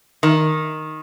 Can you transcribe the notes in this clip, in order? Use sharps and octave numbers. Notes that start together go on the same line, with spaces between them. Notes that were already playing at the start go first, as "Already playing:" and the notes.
D#3